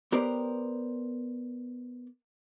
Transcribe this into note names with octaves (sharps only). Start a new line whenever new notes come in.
B3 G4 A#4 C5 D5